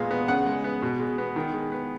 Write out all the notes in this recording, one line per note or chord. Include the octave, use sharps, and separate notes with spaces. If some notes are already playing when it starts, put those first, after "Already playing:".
Already playing: A#2 G#3 B3 F5
B3
C#3 F#5
G#3
B3
B2
G#3
B3
D#3
G#3
B3